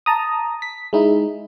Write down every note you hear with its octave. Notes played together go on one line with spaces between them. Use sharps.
A5 A#5 D#6
B6
G#3 D#4 E4